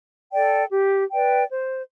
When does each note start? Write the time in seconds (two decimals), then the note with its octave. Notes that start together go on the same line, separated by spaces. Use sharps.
0.33 A4 D5 G5
0.72 G4
1.12 B4 D5 G5
1.52 C5